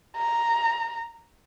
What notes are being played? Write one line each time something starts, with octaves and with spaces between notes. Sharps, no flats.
A#5